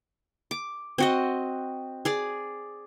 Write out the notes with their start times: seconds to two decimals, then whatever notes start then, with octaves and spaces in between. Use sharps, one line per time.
0.51 D6
0.98 C4 F#4 D#5
2.05 G#4 D5